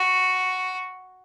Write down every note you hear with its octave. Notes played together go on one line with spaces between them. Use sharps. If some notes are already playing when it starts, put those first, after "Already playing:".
Already playing: F#4